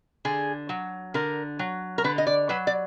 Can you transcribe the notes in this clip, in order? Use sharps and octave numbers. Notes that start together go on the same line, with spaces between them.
D3 G#4
F#3
D3 A#4
F#3
A#4
D3 B4
D#5
D5
F#3 B4
D5